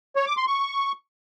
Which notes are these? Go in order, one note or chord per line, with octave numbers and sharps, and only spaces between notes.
C#5
D6
C6
C#6